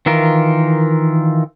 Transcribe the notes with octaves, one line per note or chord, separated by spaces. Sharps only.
D#3 E3 F4 A#4